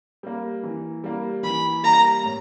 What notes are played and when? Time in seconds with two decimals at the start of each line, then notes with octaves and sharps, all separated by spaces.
0.23 G3 A#3
0.63 E3
1.04 G3 A#3
1.43 E3 B5
1.83 G3 A#3 A#5
2.23 A2